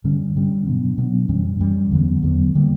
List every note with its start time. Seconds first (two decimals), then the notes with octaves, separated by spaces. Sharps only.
0.04 G2 D3 G3 C#4
0.35 G2 D3 G3 C#4
0.66 B2 F#3 B3 D4
0.98 B2 F#3 B3 D4
1.29 F#2 E3 G3 C#4
1.59 F#2 E3 G3 C#4
1.92 E2 D3 F#3 B3
2.23 E2 D3 F#3 B3
2.55 D3 G3 A#3